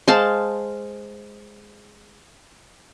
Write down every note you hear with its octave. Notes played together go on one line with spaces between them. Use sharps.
G#3 C5 F5 A5